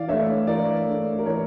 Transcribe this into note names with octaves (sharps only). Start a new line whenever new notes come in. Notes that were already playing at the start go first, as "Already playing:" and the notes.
Already playing: E3 D5 F5
A3 D4 C#5 E5
E3 A#4 D5
A3 D4
A#4
E3 C#5